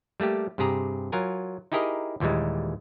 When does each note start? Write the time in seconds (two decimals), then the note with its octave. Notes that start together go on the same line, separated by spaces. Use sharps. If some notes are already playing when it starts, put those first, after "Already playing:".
0.20 G3 A3 A#3 G4
0.58 G2 C3 G4 G#4 A#5
1.12 F#3 F4 A#4 G#5
1.72 D#4 E4 G4 G#4 A#4 D#5
2.20 D#2 A#2 E3 G3 G#3